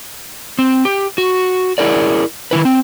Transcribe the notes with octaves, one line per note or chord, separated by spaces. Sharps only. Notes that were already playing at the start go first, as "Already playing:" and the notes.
C4
G4
F#4
E4 G#4 A#4 D5
D#3 E3 E4 B4
C4